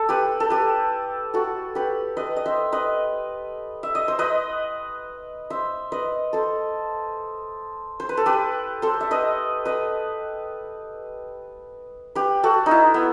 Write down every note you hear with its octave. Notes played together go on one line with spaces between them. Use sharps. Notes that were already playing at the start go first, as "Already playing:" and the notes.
Already playing: A4
G4 B4
A4
G4 B4
F#4 A4
G4 B4
B4 D#5
D#5
C5 E5
B4 D#5
E5
D#5
C5
B4 D#5
C5 E5
B4 D#5
A4 C5
C5
B4
A4
G4 B4
A4 C5
E5
B4 D#5
B4 D#5
G4 B4
F#4 A4
D#4
E4
B3